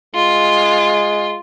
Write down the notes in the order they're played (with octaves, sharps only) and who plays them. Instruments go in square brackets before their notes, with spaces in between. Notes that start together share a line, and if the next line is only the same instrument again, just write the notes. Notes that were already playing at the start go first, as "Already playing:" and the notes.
[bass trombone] G#3 [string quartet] F4